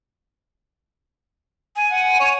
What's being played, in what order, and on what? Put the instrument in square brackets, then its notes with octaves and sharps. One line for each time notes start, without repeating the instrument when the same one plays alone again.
[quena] G#5
[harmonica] F#5
C#5